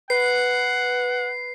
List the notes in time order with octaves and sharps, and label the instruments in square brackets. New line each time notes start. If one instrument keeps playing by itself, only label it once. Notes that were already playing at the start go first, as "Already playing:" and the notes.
[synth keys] B4 [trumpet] F#5 [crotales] C7